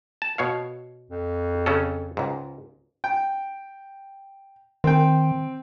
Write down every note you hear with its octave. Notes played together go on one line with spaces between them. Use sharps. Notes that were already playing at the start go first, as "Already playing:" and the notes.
A5
B2 C#5 F5
F2
C#3 C#4 A4
C#2 G#2
G5
D#3 C4 G5